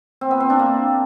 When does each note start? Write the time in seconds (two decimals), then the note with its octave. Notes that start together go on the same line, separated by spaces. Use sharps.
0.21 C4
0.31 B3
0.40 C4
0.50 D4
0.59 A#3